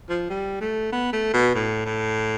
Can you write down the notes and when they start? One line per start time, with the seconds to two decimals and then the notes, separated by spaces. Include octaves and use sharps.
0.09 F3
0.30 G3
0.61 A3
0.92 B3
1.13 A3
1.34 B2
1.55 A2
1.85 A2